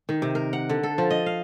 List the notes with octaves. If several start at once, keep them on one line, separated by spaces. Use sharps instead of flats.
D#3
C3
A#4
F#5
D3
A4
F3
D#5
F5